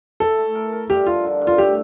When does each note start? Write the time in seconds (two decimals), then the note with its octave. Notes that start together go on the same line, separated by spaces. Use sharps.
0.20 E4 A4
0.38 A3
0.55 A#4
0.72 A#4
0.90 G2 G4
1.06 F3 F4
1.24 D3
1.41 G2
1.47 F4
1.58 A2 G4